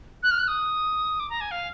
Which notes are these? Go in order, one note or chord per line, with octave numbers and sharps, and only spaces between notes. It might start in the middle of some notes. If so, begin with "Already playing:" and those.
F#6
F6
F#6
D#6
D6
A#5
G#5
F5